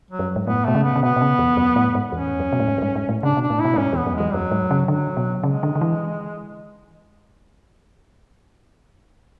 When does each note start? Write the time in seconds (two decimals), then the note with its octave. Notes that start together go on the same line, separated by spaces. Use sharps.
0.11 F#3
0.19 F#2
0.36 G#2
0.47 A2 B3
0.66 B2 A3
0.75 C#3
0.84 B3
0.96 C#3
1.03 B2 B3
1.16 B2
1.21 C#3
1.39 E2
1.57 F#2
1.76 A2
1.95 G#2
2.12 E2 C#4
2.40 F#2
2.52 B2
2.60 A2
2.68 G#2
2.78 F#2
2.82 G#2
2.95 G#2
3.09 A2
3.23 C#3 D4
3.37 B2 D4
3.50 A2
3.60 B2 E4
3.74 A2
3.78 G#2 C#4
3.93 E2 B3
4.07 F#2
4.15 E2 G#3
4.33 F#2 F#3
4.51 G#2
4.71 C#3
4.88 D3 F#3
5.17 B2
5.43 C#3 G#3
5.63 D3
5.75 D3
5.81 E3